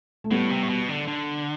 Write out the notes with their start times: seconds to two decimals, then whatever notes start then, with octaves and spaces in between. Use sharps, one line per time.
0.24 A3
0.30 A2 G3 B3
0.51 C3
0.63 A2
0.69 B2
0.88 D3
1.07 D3